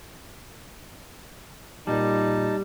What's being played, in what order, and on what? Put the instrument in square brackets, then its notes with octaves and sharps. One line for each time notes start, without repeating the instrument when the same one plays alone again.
[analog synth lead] A#2 [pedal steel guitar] G3 [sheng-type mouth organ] D#4 A5